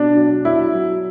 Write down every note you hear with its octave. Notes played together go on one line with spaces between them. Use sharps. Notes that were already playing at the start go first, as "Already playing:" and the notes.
Already playing: B2 D4
F#3
F#3 E4
F#3